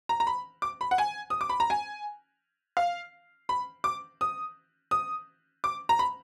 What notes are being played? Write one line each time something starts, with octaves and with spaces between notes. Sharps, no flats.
A#5
A#5
B5
D6
B5
F#5
G#5
D#6
D6
B5
A#5
G#5
F5
B5
D6
D#6
D#6
D6
A#5
B5